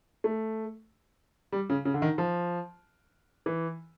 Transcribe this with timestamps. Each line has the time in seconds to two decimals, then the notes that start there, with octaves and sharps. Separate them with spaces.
0.24 A3
1.52 G3
1.70 C#3
1.85 C#3
1.94 D3
2.02 D#3
2.18 F3
3.46 E3